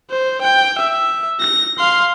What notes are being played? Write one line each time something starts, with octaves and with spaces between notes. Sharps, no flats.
C5
G5
E5
A#6
F5 C6